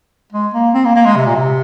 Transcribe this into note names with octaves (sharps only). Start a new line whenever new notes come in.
G#3
A#3
C4
A#3
A#3
G#3
C3
A#2
C3